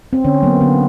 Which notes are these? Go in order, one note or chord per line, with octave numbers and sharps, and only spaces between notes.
C4
D3 C#4
F#3 A#3 B3
D3 B3